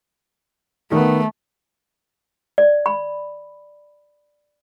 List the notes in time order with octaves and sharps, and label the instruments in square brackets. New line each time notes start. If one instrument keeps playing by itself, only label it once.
[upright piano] D#3 B3 [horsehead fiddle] A3
[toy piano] D5
B5